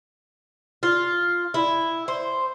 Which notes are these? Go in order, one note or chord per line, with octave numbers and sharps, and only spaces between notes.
F4
E4
C5